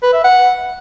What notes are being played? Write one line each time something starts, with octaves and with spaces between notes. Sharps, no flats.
B4
E5
F#5